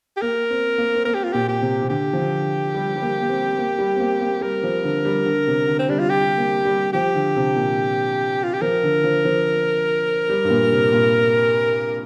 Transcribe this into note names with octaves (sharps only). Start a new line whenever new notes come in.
G4
A#3 A#4
C4
A#3
C4
A#3 A#4
G4
F4
A#2 G4
G4
C3
C3
D3 G4
F3
D3
G3
G3
A#3
A#3
C4
A#3
G3
C4
A#3
A#3
G3 A#4
F3
D3
G3
D3
C3
D3
C4
G3 D4
F4
G3 G4
A#3
G3
F3 G4
D3
C3
A#2
F4
G4
F3 A#4
D3
F3
F3
G3
G2
A#2
C3
A#2